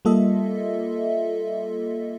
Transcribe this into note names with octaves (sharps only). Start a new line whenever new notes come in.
G3 A#3 F4 A4 D#5 E5